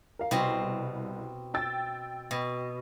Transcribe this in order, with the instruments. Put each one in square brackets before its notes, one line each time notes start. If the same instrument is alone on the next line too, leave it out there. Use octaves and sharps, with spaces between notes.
[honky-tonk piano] A#4 F5
[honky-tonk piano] C2 [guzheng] B2 C4 C6
[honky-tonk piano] G5 E6 A6
[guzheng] B2